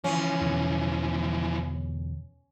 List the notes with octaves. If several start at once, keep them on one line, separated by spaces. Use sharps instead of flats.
E3 F3 C#4
E2 B2 D3